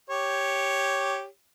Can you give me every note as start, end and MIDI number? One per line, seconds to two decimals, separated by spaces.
0.10 1.26 67
0.10 1.26 73